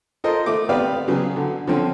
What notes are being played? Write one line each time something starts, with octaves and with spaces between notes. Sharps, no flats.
F4 A4 A#4 C5 D#5
A3 D6
B3 C4 G4 B4 D5 F5
C#3 F#3 B3 G#4
D3
D3 F3 C4 C#4